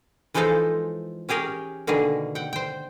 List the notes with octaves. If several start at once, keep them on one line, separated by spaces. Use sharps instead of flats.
E3 F3 G#3 D#4 A4 C5
C#4 G4 G#4 A#4 C#5
B2 D3 D#3 A#3 G#4
F#5 G5
C5 G5